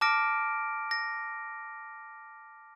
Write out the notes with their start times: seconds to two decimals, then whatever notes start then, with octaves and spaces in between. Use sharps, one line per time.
0.01 A5 D6 F6 A#6 D7
0.91 A#6